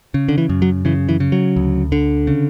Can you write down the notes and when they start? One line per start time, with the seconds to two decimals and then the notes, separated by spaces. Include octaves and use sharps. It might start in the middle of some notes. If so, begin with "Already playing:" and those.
0.14 C#3
0.29 D3
0.38 E3
0.49 F#2
0.62 F#3
0.85 C#3 E3
1.09 E3
1.20 C#3
1.32 F#3
1.56 D2
1.92 D3
2.27 C#3